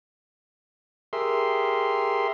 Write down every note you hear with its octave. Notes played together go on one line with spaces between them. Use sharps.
G4 G#4 A#4 E5 C6